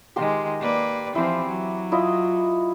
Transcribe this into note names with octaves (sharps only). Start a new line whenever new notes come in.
D#3 G#3 G4 G5 C6
A#3 B4 D5
E3 F3 C4 E4 D6
F#3
E4 F4 D#5